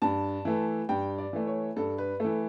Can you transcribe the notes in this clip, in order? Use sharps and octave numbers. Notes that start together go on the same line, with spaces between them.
G2 A5
E3 A3
G2 G5
D5
E3 A3
C#5
G2 A4
B4
E3 A3 A4